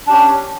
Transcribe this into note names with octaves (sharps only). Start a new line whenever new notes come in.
C#4 D4 G4